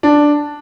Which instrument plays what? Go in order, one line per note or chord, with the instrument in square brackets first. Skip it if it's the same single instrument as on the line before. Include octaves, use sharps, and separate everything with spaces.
[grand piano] D4